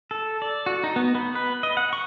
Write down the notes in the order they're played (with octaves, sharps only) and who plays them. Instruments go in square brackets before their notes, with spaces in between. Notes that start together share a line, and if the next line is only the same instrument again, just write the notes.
[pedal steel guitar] A4
D5
F#4
D#4
B3
B3
B4
D#5
F#5
C#6